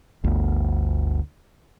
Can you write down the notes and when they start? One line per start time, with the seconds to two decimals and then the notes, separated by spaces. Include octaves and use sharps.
0.24 G1 D2